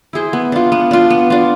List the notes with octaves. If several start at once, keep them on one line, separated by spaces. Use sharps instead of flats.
E4 G#4 C5
B3
D4 F4
B3
D4 F4
B3
D4 F4